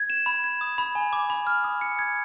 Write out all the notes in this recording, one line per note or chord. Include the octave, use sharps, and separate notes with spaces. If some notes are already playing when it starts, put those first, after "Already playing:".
Already playing: G#6
E7
B5
G#6
D#6
B5
G#5
D6
B5
F6
D#6
C#7
G#6